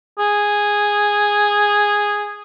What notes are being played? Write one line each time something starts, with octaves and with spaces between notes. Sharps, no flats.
G#4